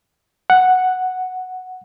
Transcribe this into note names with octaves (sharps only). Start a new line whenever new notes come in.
F#5